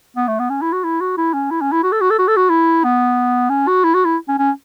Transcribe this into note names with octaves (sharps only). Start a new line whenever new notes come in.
B3
A3
B3
C#4
E4
F#4
E4
F#4
E4
C#4
E4
C#4
E4
F#4
A4
F#4
A4
F#4
A4
F#4
E4
B3
C#4
F#4
E4
F#4
E4
C#4
C#4